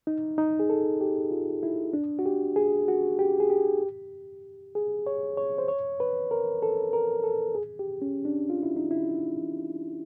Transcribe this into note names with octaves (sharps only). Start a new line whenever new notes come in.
D#4
D#4
G#4
A4
G4
F4
E4
D4
F#4
G4
G#4
F#4
G4
G#4
G4
G#4
C#5
C#5
C5
C#5
B4
A#4
A4
A#4
A4
G#4
G4
C#4
D4
F4
E4
D#4
E4